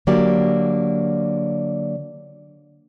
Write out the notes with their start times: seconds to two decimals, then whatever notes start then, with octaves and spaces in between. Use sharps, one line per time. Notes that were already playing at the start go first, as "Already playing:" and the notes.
0.07 D3 F#3 A#3 G4 D5